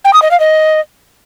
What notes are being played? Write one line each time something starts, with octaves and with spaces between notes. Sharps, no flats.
G5
D#6
D#5
F5
D#5